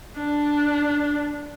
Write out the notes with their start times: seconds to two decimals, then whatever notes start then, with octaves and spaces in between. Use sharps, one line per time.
0.17 D4